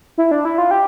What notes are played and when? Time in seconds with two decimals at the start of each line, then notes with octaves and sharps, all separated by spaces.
0.18 E4
0.31 D4
0.45 E4
0.58 F4
0.71 G4